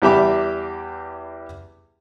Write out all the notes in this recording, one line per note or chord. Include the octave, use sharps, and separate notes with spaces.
E2 G3 G4 E5 B5 D6